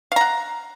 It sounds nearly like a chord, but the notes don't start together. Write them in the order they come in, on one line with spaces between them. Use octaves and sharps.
F5 A#5 F#5